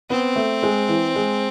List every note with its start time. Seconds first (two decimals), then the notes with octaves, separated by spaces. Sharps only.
0.10 B3 C4
0.36 A3
0.63 G#3
0.88 E3
1.16 G#3